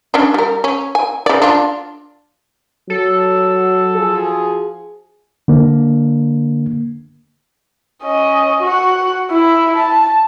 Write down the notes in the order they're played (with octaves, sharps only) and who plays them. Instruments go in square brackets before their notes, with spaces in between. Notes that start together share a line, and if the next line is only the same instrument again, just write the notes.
[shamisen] C#4 D4
G3 A#4
C#4
G#5
C#3 D5
D4 F4
[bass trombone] F#3 [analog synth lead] A4
[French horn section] F3 F#4 G#4
[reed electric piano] D3 A#3
[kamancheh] C#4 D#5
F#4 F#5
E4
A5